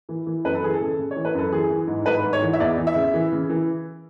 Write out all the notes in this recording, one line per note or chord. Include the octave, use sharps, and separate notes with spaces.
E3
E3
F#2 B4
A4
E3 G#4
A4
C#3
C#3
C#5
E3
B4
F#2 A4
E3 G#4
E3
G#2
G#2 B4
G#2
C#5
E3
E5
E2 D5
E3
E5
C#3
E3
C#3
E3